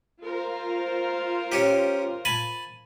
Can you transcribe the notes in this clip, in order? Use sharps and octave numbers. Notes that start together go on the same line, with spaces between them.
F4 A#4 C5
C#4 G4
G#5 A5 B5